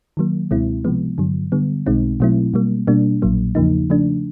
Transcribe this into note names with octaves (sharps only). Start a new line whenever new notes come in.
D#3 F#3 A#3
C#2 B2 G#3 C4 E4
C3 F3 G#3 B3
G2 D3 F#3
D3 G3 B3
B1 B2 G#3 C4 D#4
B2 F#3 A3 C4 E4
B2 G3 A#3
B2 G3 A#3 D4
A#1 A#2 F#3 A#3
E2 C#3 F3 A#3 D#4
C#3 F3 A3 D4